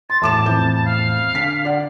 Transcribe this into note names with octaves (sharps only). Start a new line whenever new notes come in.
C6 A6
E2 A2 A3 A5 D6 E7
F2 E3 G6
F5
D3 B6
D5 F#5